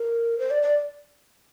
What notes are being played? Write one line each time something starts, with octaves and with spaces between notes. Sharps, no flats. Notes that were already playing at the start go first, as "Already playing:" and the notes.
Already playing: A#4
C5
D5
D5